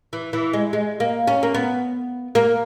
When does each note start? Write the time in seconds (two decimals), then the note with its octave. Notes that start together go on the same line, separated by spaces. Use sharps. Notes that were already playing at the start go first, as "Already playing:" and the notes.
0.13 E3
0.33 E3
0.53 G#3
0.73 G#3
1.00 A#3
1.27 C#4
1.43 A#3
1.55 B3
2.35 A#3